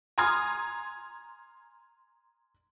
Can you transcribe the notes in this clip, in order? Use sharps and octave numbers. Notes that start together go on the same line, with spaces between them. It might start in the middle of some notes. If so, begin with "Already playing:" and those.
G#5 A#5 C6 D#6 F6 G#6